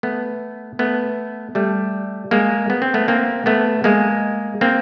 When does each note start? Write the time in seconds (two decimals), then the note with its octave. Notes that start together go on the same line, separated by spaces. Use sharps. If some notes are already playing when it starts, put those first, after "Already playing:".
0.03 A3 B3
0.79 A3 B3
1.55 G3 A3
2.31 G#3 A#3
2.70 B3
2.82 C4
2.94 A3 B3
3.08 A#3 C4
3.46 A3 B3
3.84 G#3 A#3
4.61 A#3 C4